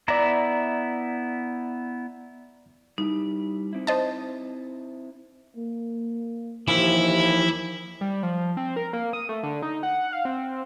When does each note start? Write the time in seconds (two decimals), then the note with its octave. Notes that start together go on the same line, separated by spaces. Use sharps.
0.08 B3 E4 D5 E5 A#5
2.98 G3 D#4 E4 G4
3.73 C4 E4
3.87 C5 D#5 A5
5.57 A#3
6.68 D#2 E3 F3 E4 G4
8.01 G3
8.23 F3
8.57 C4
8.76 A#4
8.93 A#3
9.13 D#6
9.29 A3
9.43 D3
9.62 D#4
9.83 F#5
10.13 F5
10.25 C4